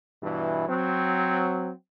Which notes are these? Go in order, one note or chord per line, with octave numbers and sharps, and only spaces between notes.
G2 B2 E3
F#3 C4